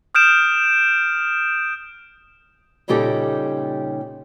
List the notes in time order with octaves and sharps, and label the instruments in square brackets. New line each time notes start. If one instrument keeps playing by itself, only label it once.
[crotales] D#6 F6 G6 D7 E7
[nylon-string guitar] A#2 C#3 G3 D#4 G4 A4